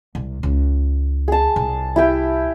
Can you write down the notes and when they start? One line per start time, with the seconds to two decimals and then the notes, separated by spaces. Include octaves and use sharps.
0.15 C2
0.43 C#2
1.28 G#4 A5
1.56 C2
1.96 E4 G4 G5